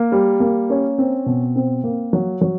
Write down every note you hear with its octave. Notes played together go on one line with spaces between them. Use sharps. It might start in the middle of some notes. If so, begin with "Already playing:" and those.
Already playing: A#3
G3
A#3
C#4
C4
B2
C4
A#3
F#3
F#3